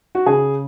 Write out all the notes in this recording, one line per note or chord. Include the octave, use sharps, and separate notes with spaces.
F#4
C#3 G#4